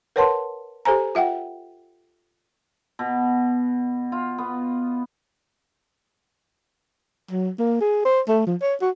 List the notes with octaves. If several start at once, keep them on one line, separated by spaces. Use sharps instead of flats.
A#4 B4 C#5 F#5 A5 C6
G4 A4 C5 G#5 A#5
F4 E5 F#5 G5
B2
F4
B3
F#3
A#3
G#4
C5
A3
F3
C#5
F#4